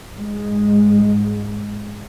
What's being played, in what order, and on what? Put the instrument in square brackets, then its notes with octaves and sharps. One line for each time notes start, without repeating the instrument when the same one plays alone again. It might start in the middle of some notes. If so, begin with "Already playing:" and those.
[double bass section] G#2 G#3